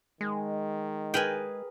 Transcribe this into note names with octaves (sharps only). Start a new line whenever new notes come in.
D#3 G#3
G#4 A#4 B4 G5 G#5